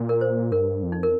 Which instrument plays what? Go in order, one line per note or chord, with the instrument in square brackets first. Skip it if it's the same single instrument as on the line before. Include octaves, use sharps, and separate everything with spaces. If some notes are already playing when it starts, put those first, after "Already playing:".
Already playing: [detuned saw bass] A#2
[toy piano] A#4
C5
[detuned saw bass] G2 [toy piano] A#4
[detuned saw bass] F2
[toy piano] D#4
A#4